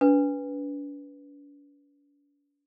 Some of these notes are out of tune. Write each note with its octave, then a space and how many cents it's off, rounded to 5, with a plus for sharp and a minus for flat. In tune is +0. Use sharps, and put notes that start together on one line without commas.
D4 -45 B4 +0